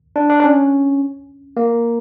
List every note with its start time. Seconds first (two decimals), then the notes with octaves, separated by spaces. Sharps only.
0.16 D4
0.30 D4
0.40 D4
0.44 C#4
1.57 A#3